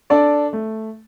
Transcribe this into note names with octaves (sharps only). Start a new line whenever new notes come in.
D4 A4 D5
A3